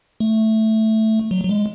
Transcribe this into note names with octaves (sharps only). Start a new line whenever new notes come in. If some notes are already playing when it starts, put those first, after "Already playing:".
A3
F#3
F#3
G#3